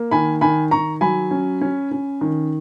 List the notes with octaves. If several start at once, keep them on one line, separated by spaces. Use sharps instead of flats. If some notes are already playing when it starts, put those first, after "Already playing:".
Already playing: A#3
D#3 G#5 B5
D#3 G#5 B5
D#3 A#5 C#6
F#3 G#5 B5
C#4
C#4
C#4
D#3